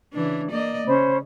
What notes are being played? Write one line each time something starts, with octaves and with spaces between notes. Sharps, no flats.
C#3 E3 D4
A#3 D5 D#5
C#3 C#4 C5 B5